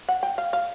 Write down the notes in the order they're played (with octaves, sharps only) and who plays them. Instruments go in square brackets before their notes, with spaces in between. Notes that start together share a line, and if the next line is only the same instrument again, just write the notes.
[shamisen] F#5
G5
F5
F5